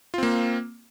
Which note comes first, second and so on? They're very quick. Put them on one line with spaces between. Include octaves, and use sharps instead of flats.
F4 C4 A#3